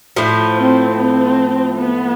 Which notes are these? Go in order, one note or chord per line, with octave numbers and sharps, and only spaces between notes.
A2 F3 A3
C4
C4
B3